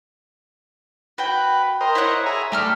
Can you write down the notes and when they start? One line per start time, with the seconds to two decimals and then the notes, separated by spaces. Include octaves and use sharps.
1.18 F#4 B4 G5
1.81 A#4 C5 D#5
1.95 E4 C#5 F#5
2.26 G#4 E5 A#5
2.52 G3 A3 G4 A4 F6